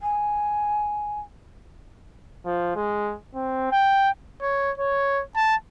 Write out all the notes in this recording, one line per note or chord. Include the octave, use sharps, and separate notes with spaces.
G#5
F3
G#3
C4
G5
C#5
C#5
A5